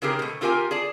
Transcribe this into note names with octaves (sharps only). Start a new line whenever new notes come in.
C#3 C4 G4 G#4 A#4
B2 A3
C4 F4 G4 A#4 F5 G#5
G#4 D5 A5